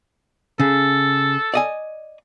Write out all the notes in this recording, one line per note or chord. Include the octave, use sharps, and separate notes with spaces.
C#3 A4
D5 D#5 G#5